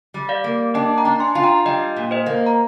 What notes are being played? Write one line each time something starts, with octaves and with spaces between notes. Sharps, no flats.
G3
D5 F5
A#3
D4 D#5 G5
G5 A#5
D4
G#5 C6
F4
G5 A#5
G3 D#5 G5
A#2
C5 D#5
A#3
A#5